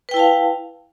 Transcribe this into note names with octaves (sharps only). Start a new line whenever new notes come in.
E4 B4 F5 G5 A5